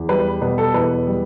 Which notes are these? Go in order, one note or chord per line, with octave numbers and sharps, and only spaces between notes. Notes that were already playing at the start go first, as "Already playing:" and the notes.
Already playing: E2
G3 B4
B2 B4
A4
E2 B4
G3